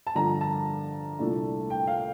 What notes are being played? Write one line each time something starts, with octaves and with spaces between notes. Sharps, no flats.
A5
G2 D3 F3 A#5
A5
C2 A#2 A3 D4
G5
F5